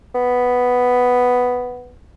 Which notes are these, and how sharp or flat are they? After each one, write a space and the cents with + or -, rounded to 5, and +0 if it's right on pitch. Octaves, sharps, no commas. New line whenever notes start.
B3 +5